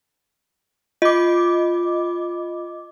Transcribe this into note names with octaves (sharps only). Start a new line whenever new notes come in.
F4 D#5 D6